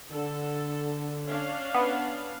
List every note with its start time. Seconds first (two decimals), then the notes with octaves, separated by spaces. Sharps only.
0.11 D3 A4
1.27 C#4 D4 F5
1.75 B3